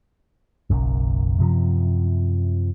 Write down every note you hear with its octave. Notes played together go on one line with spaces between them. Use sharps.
F#1 B1 F#2
F#2 C3 F3